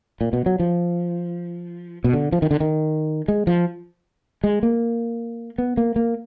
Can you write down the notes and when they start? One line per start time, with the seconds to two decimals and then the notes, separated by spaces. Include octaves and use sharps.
0.21 A#2
0.33 B2
0.46 F#3
0.60 F3
2.04 B2
2.13 D3
2.32 F3
2.42 D#3
2.51 D3
2.60 D#3
3.28 G#3
3.47 F3
4.44 G#3
4.63 A#3
5.58 B3
5.77 A#3
5.96 A#3